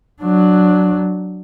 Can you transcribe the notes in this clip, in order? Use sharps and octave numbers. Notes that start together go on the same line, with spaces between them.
F#3 D4